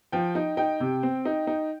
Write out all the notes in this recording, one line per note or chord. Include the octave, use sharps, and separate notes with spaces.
F3 G5
D#4
D#4 G5
C3
C4
D#4
D#4